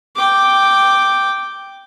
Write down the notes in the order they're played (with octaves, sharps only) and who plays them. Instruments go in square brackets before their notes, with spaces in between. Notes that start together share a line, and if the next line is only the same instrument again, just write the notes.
[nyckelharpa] G5 D6